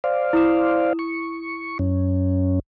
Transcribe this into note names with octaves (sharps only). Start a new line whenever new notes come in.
C5 D5 F5
E4 D#6 E7
C#6
F#2 C#4